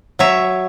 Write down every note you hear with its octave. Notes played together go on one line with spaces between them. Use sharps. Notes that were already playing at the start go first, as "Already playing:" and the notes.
F#3 C#5 E5